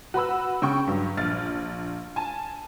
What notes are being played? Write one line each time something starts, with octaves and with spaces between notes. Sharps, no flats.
F#4 B4 B5 E6
C#3 G5 C#6
G2 F#3
A#1 F6 A6
G#5 A5